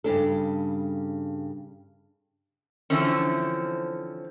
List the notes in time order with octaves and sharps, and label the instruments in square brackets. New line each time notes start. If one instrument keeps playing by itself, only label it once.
[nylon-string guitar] G2 C#3 D4 A4
[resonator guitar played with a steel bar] D3 E3 F3 C4 C#4